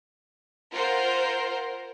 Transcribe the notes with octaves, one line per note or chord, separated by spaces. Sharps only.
F4 A#4 C5 F#5